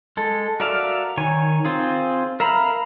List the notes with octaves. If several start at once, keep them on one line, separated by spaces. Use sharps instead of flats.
G#3 A4
F#4 A#4 D5 E5 F5
D#3 C#5 G#5
C4 F4 G#4
A#4 E5 F5 A#5 B5